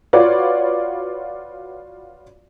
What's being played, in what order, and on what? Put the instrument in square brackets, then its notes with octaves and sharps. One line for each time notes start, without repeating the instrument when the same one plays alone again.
[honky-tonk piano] F4 F#4 B4 C#5 D5